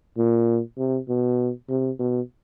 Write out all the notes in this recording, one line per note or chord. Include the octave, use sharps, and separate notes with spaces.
A#2
C3
B2
C3
B2